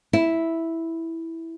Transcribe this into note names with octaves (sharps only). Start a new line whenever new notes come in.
E4